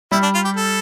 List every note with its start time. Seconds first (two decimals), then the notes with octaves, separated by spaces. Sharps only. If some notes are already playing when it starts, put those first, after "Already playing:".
0.12 G3 E4
0.23 D4
0.34 F4
0.45 G4
0.56 A4